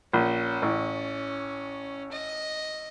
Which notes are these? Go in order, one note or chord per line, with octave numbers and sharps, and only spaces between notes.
A#1 C#4
A1
D#5